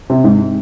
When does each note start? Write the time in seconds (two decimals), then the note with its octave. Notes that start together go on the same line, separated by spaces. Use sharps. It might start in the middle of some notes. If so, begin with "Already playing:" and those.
0.10 C3
0.24 G#2